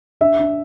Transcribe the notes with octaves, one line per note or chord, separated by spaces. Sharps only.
D4 E5
D4